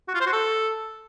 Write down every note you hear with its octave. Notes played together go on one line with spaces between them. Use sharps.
F#4
F4
C5
F#4
A4